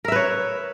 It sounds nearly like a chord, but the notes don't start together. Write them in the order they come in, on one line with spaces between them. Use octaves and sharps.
A#4 E5 B4 C#5